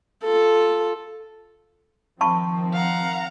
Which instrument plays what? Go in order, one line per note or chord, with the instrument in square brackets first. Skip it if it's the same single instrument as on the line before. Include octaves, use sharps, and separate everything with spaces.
[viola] F4 A4
[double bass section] D#3 F3 C4 [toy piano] A5 B5 C#6
[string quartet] F5 F#5 A#5